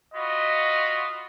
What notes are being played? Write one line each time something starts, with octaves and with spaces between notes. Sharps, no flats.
F4 F#4 D#5 B5